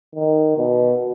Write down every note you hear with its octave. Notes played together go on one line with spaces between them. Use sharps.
D#3
B2